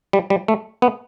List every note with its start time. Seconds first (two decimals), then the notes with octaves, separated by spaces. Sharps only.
0.13 G3
0.30 G3
0.48 A3
0.82 B3